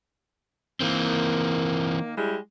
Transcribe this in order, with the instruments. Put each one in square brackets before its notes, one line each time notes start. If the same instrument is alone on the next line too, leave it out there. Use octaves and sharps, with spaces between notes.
[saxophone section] D#3 A#3 [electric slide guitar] E3 C4
[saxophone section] G3 G#3 E4